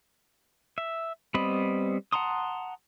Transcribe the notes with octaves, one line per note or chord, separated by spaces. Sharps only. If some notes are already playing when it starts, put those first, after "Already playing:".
E5
G3 B3 C4 D#5 B5
F#5 A5 A#5 C6 D#6